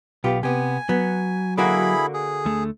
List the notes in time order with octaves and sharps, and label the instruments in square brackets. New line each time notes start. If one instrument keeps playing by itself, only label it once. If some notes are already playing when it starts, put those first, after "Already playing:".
[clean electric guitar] B1 [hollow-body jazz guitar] B3 F4 G4
[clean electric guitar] C3 [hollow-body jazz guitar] B3 G4 [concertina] G#5
[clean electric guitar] F#3 [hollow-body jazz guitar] B3
[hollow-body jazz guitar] D3 A#3 F#4 [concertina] E4 G#4 B5
[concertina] G#4
[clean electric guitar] D2 D3 A3